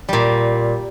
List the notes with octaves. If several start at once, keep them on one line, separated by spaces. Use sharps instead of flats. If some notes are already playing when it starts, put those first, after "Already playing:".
A#2 G3